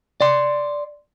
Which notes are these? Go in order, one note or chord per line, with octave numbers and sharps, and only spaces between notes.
D5 C6